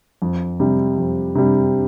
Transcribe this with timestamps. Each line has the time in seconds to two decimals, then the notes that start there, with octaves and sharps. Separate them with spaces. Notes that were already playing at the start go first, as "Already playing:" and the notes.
0.22 F2
0.60 C3 G3
0.98 F2
1.35 C3 G3